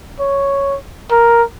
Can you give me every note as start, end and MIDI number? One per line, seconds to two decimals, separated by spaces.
0.19 0.76 73
1.11 1.43 70